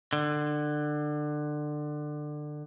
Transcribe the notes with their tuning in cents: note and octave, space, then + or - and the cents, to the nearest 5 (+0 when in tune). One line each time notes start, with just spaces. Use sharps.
D3 +25